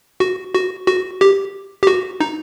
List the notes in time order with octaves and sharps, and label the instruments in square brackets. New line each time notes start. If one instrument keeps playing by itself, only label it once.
[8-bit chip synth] F#4
F#4
F#4
G4
G4
F#4
D#4